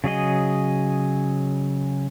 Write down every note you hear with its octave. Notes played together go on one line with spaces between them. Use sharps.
C#3 F#3 G#4 D#5